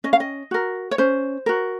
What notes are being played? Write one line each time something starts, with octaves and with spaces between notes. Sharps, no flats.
C#4 D#5
F5
D#5
F#4 A#4
C#5
C#4 C5
F#4 A#4